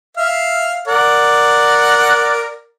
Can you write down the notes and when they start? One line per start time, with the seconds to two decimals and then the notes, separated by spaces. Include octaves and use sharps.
0.17 E5 F5
0.88 A#4 D5 F#5